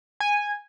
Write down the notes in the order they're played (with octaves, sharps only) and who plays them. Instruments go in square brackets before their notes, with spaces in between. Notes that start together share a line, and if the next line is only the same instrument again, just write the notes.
[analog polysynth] G#5